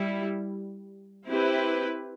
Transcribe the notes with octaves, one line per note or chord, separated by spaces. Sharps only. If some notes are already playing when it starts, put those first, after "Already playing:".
Already playing: G3 E4
C4 E4 G4 B4